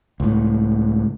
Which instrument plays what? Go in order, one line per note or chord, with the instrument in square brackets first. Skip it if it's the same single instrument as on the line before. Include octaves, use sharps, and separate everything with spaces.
[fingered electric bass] C#2 A2